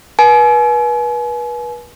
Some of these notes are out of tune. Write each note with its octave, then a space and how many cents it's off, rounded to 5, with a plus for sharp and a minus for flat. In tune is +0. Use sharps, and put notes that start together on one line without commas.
B4 -35 G#5 +40